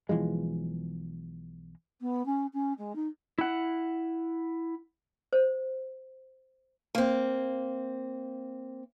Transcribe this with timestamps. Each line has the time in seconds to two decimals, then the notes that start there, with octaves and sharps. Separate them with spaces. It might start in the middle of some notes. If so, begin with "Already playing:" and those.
0.09 B1 E3 F3 G#3
2.01 B3
2.25 C#4
2.53 C#4
2.78 G#3
2.95 D#4
3.38 E4 F#5
5.33 C5
6.95 A#3 C4